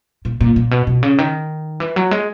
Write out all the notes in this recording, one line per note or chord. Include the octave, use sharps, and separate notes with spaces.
A#2
A#2
A#2
B2
B2
C#3
D#3
E3
F#3
G#3